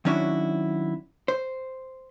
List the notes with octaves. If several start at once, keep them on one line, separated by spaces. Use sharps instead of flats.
D#3 F#3 C#4 D4 E4 F#4
C5